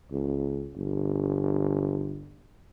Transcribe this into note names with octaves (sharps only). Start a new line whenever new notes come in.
C#2
G1